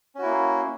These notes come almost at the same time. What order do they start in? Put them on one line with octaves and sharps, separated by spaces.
C#4 F#4 E4 A#3